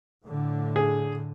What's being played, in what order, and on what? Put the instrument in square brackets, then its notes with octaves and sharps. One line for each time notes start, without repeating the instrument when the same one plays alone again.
[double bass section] A2 D3
[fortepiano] G#4